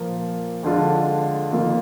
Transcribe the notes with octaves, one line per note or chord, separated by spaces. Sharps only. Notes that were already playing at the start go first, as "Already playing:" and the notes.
Already playing: A#2 F3 A#3 F4
F2 D3 G#3 D4 F4
F2 D#3 A#3 F4